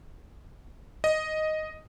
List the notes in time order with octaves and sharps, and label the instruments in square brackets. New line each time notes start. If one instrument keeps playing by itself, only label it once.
[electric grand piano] D#5